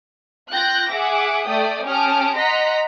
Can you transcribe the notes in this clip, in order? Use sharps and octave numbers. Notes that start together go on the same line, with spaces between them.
F4 G5 F#6 G6 A#6
G#4 E5 F#5 D6
A3 D5 G5 D#6
C#4 G4 A5 D#6 F6 D7
D#5 F#5 A#5 C6 A#6 B6